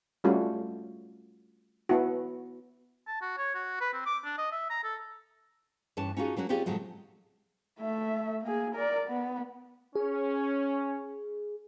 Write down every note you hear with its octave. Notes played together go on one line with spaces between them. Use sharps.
G3 A3 C#4 F4 F#4
B3 E4 F#4
A5
F#4
C#5
F#4
B4
C4
D6
D4
D#5
E5
A#5
A4
G2 E3 C#4 A5
C#4 D#4 F4 F#4 G#4
F#3 A#3 C#4 F#4
C4 C#4 F4 G4 G#4 D5
A2 C#3 F3 F#3 G#3
A3 E5
A#3 G#4
A#4 D5
B3
C#4 G#4